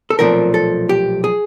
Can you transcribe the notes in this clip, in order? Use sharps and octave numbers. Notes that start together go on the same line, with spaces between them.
A4
B1 A#2 F3 A3 C4 A#4
A4
G4
G#4